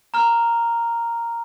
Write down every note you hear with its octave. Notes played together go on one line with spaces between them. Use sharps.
A#5 F6